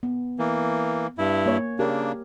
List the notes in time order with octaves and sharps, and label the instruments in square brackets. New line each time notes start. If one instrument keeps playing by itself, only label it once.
[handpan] B3
[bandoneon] E3 A#3
G2 E4
[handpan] A#3 C#5
[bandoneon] C#3 A#3 D4 [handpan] G4 A#4